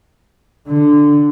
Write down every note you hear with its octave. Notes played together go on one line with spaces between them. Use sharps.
D3